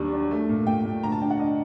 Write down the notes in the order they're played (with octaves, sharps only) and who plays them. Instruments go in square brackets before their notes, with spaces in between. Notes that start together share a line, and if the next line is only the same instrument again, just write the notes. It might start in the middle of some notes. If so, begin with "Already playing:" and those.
Already playing: [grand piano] D#2 F#3 G3 D4
D4
A3
A#2
A#2 G5
A#2
D2 A#5
A5
D4 G5
F#5
D4 D#5